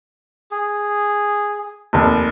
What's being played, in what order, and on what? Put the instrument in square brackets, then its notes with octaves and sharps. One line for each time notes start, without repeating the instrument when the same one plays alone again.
[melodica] G#4
[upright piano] F1 D#2